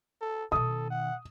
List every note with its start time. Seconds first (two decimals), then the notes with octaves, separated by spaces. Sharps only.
0.21 A4
0.52 B2 D#3 A4 D#6
0.90 F#5